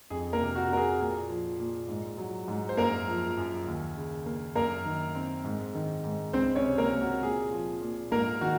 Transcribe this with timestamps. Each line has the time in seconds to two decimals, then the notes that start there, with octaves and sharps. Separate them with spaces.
0.10 F2 G#4
0.33 A#3 A#4
0.41 C3
0.55 F#4
0.70 A#3 A#4
0.77 G#4
1.00 A#2
1.29 F3
1.59 A#2
1.88 G#2
2.18 F#3
2.48 G#2
2.69 C5
2.77 F#2 A#3 A#4
3.07 F3
3.37 F#2
3.67 D#2
3.97 C#3
4.26 A#3
4.55 F#2 A#3 A#4
4.85 D#3
5.15 C4
5.45 G#2
5.75 D#3
6.04 G#2
6.33 C#2 C4 C5
6.56 C#4 C#5
6.64 C3
6.78 A#3 A#4
6.93 A#3
7.01 F#4
7.22 A#2 G#4
7.52 F3
7.82 A#2
8.11 G#2 A#3 A#4
8.41 D#3 F#4